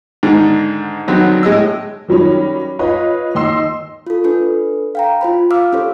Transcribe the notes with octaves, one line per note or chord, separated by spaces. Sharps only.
G#2 D3 D#3
D3 D#3 F#3 B3 C4
A2 G#3 D#5 E6
D#3 F#3 G3 C#4
F4 B4 C#5 D#5
D#2 D#5 C6 E6 C7
F4 A4
D4 A4 B4
F5 G5 A#5
F4 C5 B5
F5 D6 E6 F6
C#4 G4 A4 C5